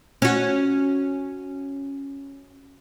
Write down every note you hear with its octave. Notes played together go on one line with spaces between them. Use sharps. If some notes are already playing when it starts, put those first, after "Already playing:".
C#4 F#4